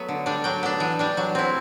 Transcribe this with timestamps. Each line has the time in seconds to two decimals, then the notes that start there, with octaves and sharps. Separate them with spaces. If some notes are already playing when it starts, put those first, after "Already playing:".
Already playing: F#3 A3 B3
0.08 D3
0.26 G3 D4
0.44 F#3 G5
0.63 B3 D4
0.80 E3
0.99 G3 D4
1.17 F#3
1.35 C4 E4